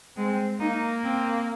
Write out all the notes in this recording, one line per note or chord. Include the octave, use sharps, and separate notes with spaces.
G#3 C4
A#3 D#4
C4